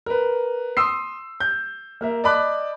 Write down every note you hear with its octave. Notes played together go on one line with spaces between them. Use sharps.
A#4 B4
C6 D#6 E6 C7
G6
A#3 A#4 E5
D5 D#5 A5 B5 D6 F#6